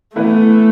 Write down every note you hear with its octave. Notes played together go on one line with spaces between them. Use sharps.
E3 A3 B3 E4 B4